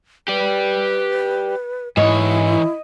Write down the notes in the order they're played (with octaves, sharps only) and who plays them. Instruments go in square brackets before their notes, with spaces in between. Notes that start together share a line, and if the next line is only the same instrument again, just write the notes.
[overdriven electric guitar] G4 D5 [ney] B4
[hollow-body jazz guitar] G#2 [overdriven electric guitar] E3 C#5 [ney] E4 [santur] D#5